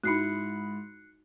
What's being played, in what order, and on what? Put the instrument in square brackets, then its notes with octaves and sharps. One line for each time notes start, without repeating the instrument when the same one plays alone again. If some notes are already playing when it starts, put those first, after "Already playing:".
[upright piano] G#2 E4 B5 [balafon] D#4 F#4 [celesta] F#6 C7 C#7